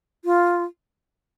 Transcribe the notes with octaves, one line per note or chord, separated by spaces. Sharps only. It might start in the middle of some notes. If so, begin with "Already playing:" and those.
F4